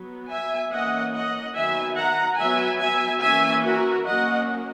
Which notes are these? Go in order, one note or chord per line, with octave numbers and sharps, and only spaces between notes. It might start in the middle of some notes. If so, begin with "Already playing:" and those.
Already playing: F#3 B3
E5 G#5
E3 A#3 C#4 D#5 F#5
D#5 F#5
D#3 F#3 B3 E5 G#5
F#5 A#5
F#3 B3 E5 G#5
E5 G#5
E3 A#3 C#4 E5 G#5
F#4 A#4
F#3 A#3 C#4 D#5 F#5